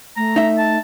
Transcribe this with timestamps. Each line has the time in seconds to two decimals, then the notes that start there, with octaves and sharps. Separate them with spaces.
0.17 A3 A#5
0.36 D#4 E5
0.58 A5